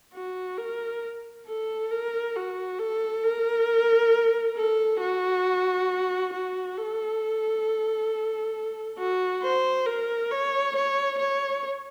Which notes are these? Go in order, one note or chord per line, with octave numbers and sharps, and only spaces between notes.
F#4
A#4
A4
A#4
F#4
A4
A#4
A4
F#4
F#4
A4
F#4
C5
A#4
C#5
C#5
C#5